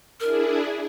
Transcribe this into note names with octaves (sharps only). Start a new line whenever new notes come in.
D4 E4 G#4 A#4